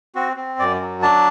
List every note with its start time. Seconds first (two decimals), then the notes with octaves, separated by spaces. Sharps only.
0.15 C4 F#4
0.37 C4
0.59 F#2 D5
0.81 F#3
1.02 D4 A5